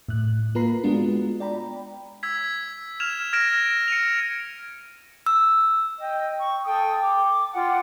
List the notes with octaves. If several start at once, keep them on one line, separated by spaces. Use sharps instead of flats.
A2 F#6
A#3 F4 B4 A#5 B5 C7
G#3 B3 D4 F4 F#4
D5 G5 A#5 B5
E6 G#6 B6
F6 G#6 E7 F7
F6 G#6 A#6 D7 E7
C#7 D#7 F7
E6
D#5 G5
C#6
A4 G5 D#6
D6
F4 F#5 G5